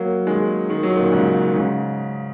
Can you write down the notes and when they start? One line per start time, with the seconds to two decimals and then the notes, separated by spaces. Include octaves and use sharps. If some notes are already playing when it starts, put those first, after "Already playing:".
Already playing: F#3 A#3
0.26 D#3 G#3
0.70 D#3
0.83 F#3
0.96 A#2 D#3
1.12 G#2 C#3
1.44 D#3
1.56 G#2 C#3